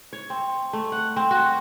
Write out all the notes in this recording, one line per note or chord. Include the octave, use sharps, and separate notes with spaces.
C#5
C4
A3
F#5
C4
F#4